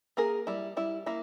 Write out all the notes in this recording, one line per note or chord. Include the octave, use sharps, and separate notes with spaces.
A#3 G#4 A#4
G3 E4
G3 E4
A#3 E4